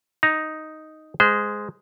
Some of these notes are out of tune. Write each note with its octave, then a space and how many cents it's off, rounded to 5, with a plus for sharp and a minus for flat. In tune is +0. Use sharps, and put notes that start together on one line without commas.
D#4 +0 A#5 +0
G#3 +0 C5 -25